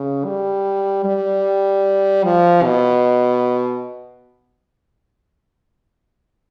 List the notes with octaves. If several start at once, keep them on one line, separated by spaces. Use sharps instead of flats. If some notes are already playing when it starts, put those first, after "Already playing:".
Already playing: C#3
G3
G3
F3
B2